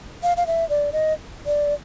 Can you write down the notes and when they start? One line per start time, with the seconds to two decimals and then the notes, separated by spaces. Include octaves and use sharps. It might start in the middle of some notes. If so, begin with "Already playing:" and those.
0.23 F5
0.37 F5
0.47 E5
0.69 D5
0.92 D#5
1.46 D5